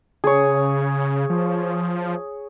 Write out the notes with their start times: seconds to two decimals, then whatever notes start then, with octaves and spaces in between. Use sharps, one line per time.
0.24 C#3 G#4 C#5
1.30 F3